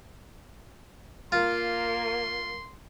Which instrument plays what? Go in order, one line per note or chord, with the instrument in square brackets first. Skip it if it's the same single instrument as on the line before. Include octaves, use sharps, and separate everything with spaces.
[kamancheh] A#3 A#4 [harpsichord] F4 [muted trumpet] C6